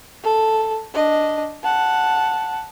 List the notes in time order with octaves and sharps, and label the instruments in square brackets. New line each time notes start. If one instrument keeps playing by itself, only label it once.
[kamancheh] A4
D4 D#5
F#5 A5